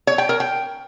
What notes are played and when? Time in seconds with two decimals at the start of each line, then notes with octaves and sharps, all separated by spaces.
0.07 C#5
0.18 G5
0.29 A#4
0.40 G5